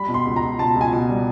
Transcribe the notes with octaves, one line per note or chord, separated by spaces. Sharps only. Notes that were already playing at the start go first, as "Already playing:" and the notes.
Already playing: G3 B5
B2
C6
C#2
A#5
C#2
B2 A5
C#2
G#5
B2
G3